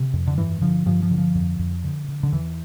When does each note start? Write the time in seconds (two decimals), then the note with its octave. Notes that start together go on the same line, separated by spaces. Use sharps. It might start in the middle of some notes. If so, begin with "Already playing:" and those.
Already playing: C3
0.13 F2
0.27 D3
0.37 G2 E3
0.61 D3 F3
0.86 G2 F3
1.03 F3
1.11 D3
1.18 F3
1.35 F2
1.59 F2
1.84 D3
2.08 D3
2.23 D3
2.32 E2 E3